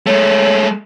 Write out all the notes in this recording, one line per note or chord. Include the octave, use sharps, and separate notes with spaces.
G#3 A3 C#5